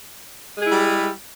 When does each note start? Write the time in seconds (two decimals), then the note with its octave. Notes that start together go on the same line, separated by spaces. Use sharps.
0.56 G#3
0.61 G#4
0.66 E4
0.71 G3